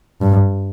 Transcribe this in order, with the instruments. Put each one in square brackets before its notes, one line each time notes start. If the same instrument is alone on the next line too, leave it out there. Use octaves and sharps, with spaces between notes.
[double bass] G2